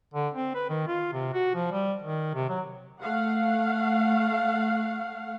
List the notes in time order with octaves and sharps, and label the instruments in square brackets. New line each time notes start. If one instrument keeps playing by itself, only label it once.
[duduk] D3
C4
B4
D#3
F4
C3
F#4
F3
G3
D#3
C3
F#3
[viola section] A3 F5 F#5